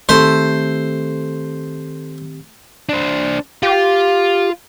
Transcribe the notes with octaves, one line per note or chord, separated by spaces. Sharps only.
D#3 A3 C4 G4 C5
D4 C5
F4 G4